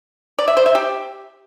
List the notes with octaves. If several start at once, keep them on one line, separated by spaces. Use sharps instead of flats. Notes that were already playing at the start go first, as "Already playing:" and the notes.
D5
E5
C5
E5
G4